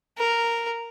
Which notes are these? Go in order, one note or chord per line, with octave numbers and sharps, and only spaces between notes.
A#4